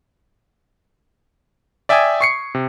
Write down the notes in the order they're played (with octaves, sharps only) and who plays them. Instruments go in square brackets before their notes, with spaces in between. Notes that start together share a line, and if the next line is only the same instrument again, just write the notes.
[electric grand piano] D5 E5 G5 G#5 D#6 G#6
C#6 C7 C#7
C3